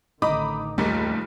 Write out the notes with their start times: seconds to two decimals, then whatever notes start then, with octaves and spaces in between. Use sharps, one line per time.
0.22 A1 D3 D#3 D#4 B5 D6 D#6
0.78 F#1 D#2 D#3 F3 G3 A3